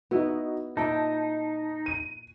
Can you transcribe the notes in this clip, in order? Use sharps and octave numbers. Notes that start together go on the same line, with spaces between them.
B3 D#4 E4 F#4
A#2 D#4 E4 G5 A5
D#7